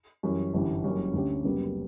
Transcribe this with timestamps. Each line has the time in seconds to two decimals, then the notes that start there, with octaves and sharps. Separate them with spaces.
0.23 F#2 E3 G3 C#4
0.54 G1 F#2 E3 G3
0.84 F#1 F#2 C#3 G3 C#4
1.14 D2 D3 G3 C#4 G4
1.44 F#1 F#2 C#3 G3 B3